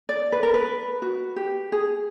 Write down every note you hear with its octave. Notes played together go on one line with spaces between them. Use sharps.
D5
B4
A#4
B4
F#4
G4
G#4